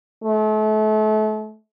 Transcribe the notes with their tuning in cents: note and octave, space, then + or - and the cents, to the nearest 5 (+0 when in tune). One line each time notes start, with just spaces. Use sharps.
A3 -35